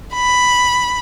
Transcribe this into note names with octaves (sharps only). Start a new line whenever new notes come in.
B5